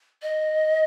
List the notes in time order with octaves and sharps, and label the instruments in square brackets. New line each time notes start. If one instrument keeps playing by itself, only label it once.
[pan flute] D#5